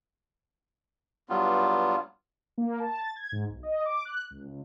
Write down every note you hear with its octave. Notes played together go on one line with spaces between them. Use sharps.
G2 F#3 G3 B3 F4
A#3
A5
A6
G#6
G#2
B1
D#5
D6
F#6
C#2
C#2